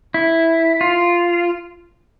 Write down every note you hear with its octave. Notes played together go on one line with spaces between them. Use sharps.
E4
F4